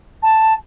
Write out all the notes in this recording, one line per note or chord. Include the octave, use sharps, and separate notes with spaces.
A5